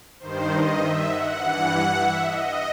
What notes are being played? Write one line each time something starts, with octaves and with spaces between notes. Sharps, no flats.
G2 D#3 C5
D#5
E5
F#5
G2 E3
E5
D#5